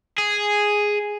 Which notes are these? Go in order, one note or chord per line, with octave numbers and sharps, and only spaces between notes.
G#4